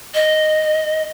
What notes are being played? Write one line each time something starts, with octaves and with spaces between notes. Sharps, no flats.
D#5